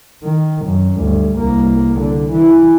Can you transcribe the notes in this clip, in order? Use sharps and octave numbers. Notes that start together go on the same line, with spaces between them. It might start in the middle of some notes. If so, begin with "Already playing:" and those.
D#3
F#2
D2 G2
C2 A#3
D3
E3